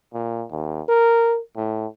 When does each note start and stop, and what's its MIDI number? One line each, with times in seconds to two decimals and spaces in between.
0.14 0.45 46
0.51 0.82 39
0.89 1.40 70
1.57 1.87 45